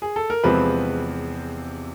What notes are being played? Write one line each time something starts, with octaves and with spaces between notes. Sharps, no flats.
G#4
A4
A#4
E2 C3 F3 G#3 C4 B4